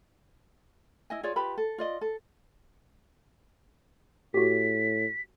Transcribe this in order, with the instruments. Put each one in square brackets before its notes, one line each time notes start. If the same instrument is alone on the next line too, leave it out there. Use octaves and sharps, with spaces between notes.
[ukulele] E4 D#5 G#5
F4 G#4 C#5 D5
F4 G4 B4 B5
A4
F4 D5 D#5
A4
[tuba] A2 [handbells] F#4 G4 [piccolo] B6